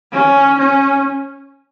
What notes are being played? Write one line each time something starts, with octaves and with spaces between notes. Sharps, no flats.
C#4
C#4